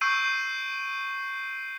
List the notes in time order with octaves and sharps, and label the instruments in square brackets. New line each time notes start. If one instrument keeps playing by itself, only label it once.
[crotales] C#6 E6 G6 C7 D7 D#7